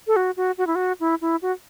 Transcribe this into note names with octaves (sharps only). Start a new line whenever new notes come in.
A4
F#4
F#4
F#4
E4
F#4
E4
E4
F#4